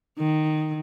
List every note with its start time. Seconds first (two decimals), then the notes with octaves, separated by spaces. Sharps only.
0.18 D#3